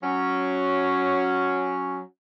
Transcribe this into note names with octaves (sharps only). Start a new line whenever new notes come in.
F#3 C#4